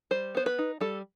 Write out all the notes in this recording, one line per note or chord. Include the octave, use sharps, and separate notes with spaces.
G3 C5
B3 C5
B4
D#4
G3 A4